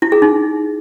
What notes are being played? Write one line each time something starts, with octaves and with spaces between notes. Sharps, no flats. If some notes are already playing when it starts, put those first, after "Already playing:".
E4
G#4
D#4